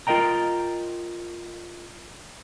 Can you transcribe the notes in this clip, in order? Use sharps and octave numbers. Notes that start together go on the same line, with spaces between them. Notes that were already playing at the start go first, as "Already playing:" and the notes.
F4 A#4 D#5 G5 A#5